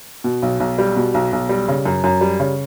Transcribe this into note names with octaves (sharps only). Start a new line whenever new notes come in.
B2
B1
B1
G3
B2
B1
B1
G3
C#3
F#2
F#2
G3
C#3